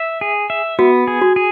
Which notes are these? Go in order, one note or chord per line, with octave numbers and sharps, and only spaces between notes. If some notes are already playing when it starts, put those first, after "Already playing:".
Already playing: E5
G#4
E5
B3 F#4
G#4
F#4
G#4